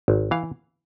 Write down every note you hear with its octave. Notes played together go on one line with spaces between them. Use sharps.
G#1
E3 F5